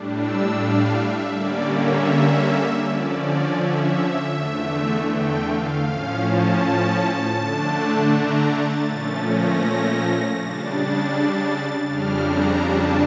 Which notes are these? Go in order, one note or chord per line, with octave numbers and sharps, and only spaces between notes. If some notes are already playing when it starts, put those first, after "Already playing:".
Already playing: A2 G3 D4
E6
F5
E5
D3 G3 A#3 C#4 D5
E5
D3 F3 C#4 D5
D5
E5
E2 D3 A3
G5
F5
A2 F3 C#4 F5
A5
D3 A3 D4
A#5
A6
A#2 F3 A3 C#4 A6
A#6
C#3 G3 D4 A6
F2 C#3 G3 D4 F6
A#5
A5